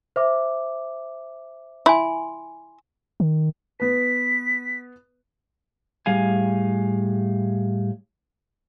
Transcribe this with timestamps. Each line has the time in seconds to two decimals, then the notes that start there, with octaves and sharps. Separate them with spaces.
0.16 C5 E5 D6
1.86 E4 G#5 C6
3.20 D#3
3.80 B3 B4 B6
6.06 A2 G3 G#4 F5 G#5